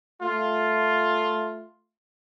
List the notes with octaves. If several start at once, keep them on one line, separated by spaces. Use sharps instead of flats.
A3 F4